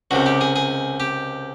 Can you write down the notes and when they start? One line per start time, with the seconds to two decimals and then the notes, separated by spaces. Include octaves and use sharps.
0.11 C#2 C3 D#3 F#4
0.26 G4
0.41 G#4
0.56 G#4
1.00 G4